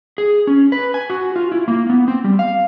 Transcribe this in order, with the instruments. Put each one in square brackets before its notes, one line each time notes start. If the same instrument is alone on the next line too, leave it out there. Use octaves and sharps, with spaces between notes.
[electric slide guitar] G#4
C#4
B4
G#5
F#4
F4
E4
A#3
B3
C4
G3
F5